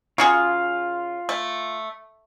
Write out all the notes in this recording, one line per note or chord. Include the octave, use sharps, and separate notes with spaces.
C#3 F4 F#4 G#4
A3